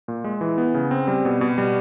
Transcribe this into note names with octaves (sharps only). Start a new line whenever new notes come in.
A#2
G#3
E3
B3
C#3
C4
G3
B2
B2
G3